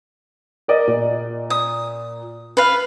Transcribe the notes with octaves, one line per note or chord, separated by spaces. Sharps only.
A#4 D5 D#5
A#2
D#6
B4 F5